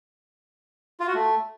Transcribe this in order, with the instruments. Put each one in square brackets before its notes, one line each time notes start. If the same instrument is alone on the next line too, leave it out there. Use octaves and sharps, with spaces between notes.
[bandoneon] F4
F#4
A3